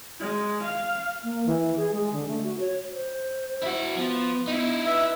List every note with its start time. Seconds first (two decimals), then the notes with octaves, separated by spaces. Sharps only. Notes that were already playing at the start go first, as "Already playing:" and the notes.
0.20 G#3
0.63 F5
1.24 A#3
1.46 E3
1.77 G#4
1.92 G#3
2.12 D3
2.28 A3
2.44 F#4
2.60 C#5
2.91 C5
3.63 E4 F#4
3.96 F3 B3
4.48 D#4 E4
4.86 B4 E5